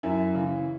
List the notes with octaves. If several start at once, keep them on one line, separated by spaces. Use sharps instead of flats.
F#2 E4
C#3 E3